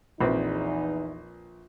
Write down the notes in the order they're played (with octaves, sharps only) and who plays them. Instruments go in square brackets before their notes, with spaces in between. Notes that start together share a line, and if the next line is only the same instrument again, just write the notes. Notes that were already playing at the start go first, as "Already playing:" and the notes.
[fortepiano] A#1 C4 B4 [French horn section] E2 E3 D#4